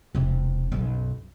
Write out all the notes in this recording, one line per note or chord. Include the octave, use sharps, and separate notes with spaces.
E1 C3
B1 F#2